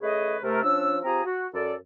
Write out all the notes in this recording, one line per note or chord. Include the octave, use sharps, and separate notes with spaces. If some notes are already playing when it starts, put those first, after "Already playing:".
C#3 A3 G#4 B4 C#5 D#5
C3 A3 A#4
F3 C#4 D4 E6
C4 F4 G4 G#4 A#5
F#4
F#2 A4 D5